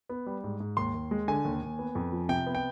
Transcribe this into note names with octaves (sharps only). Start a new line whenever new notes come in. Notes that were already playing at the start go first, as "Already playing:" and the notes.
B3
G3
G#2
G#2
D#2 C6
D#2
G#3
D3 G#5
D#2
D#2
B3
F2
F3
C3 G5
B3
G5